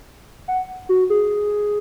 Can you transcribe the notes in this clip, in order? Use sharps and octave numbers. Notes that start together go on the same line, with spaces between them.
F#5
F#4
G#4